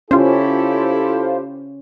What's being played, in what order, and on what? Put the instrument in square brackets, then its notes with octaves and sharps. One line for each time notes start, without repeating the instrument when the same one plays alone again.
[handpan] C#4 [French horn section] E4 G4 A4 [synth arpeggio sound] F4 C5